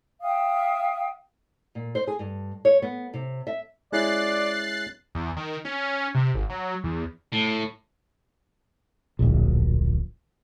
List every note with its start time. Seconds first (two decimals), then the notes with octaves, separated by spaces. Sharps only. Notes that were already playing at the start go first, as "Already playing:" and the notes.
0.22 E5 F5 G5 D#6
1.75 A#2
1.95 C5
2.07 G#4
2.19 G2
2.65 C#5
2.82 B3
3.14 C3
3.47 E5
3.92 G#3 C#4 E4 D5 F#6 A6 C7
5.15 E2
5.37 D#3
5.65 C#4
6.15 C3
6.34 G#1
6.49 F#3
6.84 E2
7.32 A2
9.19 D1 A#1